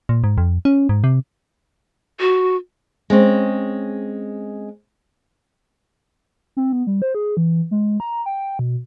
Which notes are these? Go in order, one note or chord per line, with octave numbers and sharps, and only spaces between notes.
A#2
G#2
F2
C#4
G#2
C3
F#4
G#3 C4 C#4
C4
B3
G3
C5
G#4
E3
G#3
A#5
G5
B2